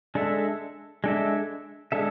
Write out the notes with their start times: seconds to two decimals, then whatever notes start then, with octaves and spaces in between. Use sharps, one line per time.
0.15 G#3 D4 A4 E5
1.04 G#3 D4 A4 E5
1.92 G#3 D4 A4 E5